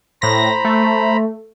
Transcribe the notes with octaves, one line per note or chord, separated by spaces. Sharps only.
A2 C5 A#5 B5 A#6
A3